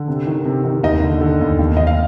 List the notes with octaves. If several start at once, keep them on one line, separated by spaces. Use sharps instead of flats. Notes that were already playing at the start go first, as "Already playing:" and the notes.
Already playing: D3
C3
D#3
C3
D#3
D#2 D#4 D#5
D3
D3
D#2
D#2
D#2 D#5
F5